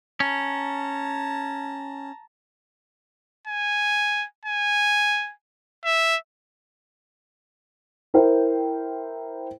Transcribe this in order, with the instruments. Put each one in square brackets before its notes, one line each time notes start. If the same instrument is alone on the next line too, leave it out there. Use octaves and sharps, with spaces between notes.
[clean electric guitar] C#4 [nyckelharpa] A5 A#5
[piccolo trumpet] G#5
G#5
E5
[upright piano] E4 A#4 C5 G5